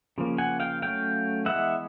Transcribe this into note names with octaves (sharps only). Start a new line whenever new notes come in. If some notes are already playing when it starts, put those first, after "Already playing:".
C#3 F3 A#3
F#5 G#5
F5 G5
F#3 A3 C#4 F5 G5
E3 G#3 B3 E5 F#5